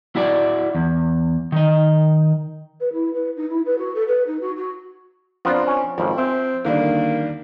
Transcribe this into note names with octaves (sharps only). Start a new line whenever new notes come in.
E4 F#4 D5
E2
D#3 D#5
B4
E4
B4
D#4
E4
B4
F#4
A4
B4
D#4
F#4
F#4
F3 B3 C4 D4 F4 A#4
C#4
G#1 F2 C#3 F3
C4 C5 E5 G#5
D3 D#3 G3 A#3